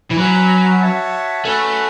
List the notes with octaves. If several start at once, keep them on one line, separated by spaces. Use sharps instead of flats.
E3
F#3 C#4 F#4 B4
F#4 C#5 E5 A5
A3 C#4 F#4 B4